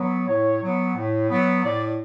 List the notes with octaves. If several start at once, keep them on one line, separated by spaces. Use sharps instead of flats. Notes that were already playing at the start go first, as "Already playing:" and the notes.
Already playing: F#3 B3
A2 C#5
F#3 B3
A2
F#3 B3
A2 D5